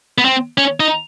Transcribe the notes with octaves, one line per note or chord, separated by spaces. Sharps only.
B3
C4
C#4
D#4